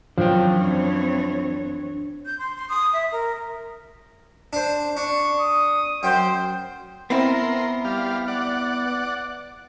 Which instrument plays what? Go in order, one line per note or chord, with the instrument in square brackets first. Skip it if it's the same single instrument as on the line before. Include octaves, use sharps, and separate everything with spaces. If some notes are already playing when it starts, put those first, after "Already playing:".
[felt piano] F#2 [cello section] E3 C4 C#5 [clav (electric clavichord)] F3 [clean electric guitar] D4 D5 G5
[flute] G6
C6
C6
D#6
E5
A#4
[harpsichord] D4 C5
[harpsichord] D4 [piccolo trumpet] C#6
[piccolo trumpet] D#6
[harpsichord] F#2 G5 [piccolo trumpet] C5
[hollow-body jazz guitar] B3 C4 E4 [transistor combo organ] A#4 C6
[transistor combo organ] G3 F5
D5 F#5